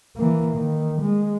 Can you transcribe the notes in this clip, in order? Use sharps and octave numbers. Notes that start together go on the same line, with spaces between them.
E3 A#3
D#3
G#3